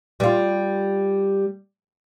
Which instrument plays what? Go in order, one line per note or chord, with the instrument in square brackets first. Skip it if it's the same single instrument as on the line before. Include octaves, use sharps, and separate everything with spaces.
[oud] G3 F4